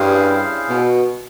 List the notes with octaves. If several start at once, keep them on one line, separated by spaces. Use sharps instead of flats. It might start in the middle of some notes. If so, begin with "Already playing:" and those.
Already playing: G2 C#4 E4 G#4 C5 F5
B2